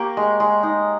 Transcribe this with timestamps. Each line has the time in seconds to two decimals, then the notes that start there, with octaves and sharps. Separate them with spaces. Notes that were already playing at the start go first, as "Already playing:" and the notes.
Already playing: A#3 G4 C#5
0.17 G#3
0.40 G#3
0.63 D#4